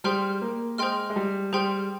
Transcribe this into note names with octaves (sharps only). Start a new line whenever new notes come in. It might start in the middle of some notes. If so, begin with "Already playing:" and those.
G3 G#4 C5 G5 C6 F6
A#3
G#3 G#4 C5 G5 C6 F6
G#3
G3
G3 G#4 C5 G5 C6 F6